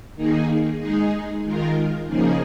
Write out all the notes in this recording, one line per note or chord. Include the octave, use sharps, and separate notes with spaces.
D#3 A#3 D#4 G#4
G#3 D#4 G#4
D#3 G#3 F4 A#4
C#3 F3 A#3 D#4 G#4